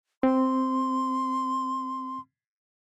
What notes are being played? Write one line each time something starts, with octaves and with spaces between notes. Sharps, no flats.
C4 C6